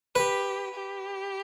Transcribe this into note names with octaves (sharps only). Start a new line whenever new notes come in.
G4 B4
G4